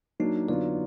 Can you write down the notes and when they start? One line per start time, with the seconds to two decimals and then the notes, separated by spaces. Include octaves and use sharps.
0.20 F#3 A#3 D4 D#4
0.49 D3 F#3 B3 F4 D5